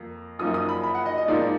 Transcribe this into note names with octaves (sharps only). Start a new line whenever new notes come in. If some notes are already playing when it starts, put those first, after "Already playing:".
Already playing: F2 A#3
F#2 F3 A#3 D#4 D#6
D#6
B5
B5
F#5
D#5
D#5
G#2 F3 A#3 D#4 D5